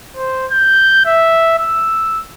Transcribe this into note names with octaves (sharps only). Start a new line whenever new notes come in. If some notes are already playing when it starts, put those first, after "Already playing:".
C5
G6
E5
E6